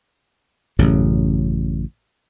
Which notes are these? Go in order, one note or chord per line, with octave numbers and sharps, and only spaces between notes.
A1 F#2 C#3